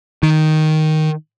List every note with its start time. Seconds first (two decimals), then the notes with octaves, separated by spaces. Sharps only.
0.23 D#3